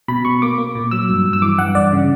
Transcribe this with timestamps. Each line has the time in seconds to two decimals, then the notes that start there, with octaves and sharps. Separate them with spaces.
0.08 B2 B5
0.25 B2 C#6
0.42 A#3 D6
0.58 A#3
0.75 A#2
0.91 F#3 E6
1.09 G2
1.25 G2
1.33 E6
1.42 E3 D6
1.59 G2 F#5
1.75 G2 D5
1.92 C#3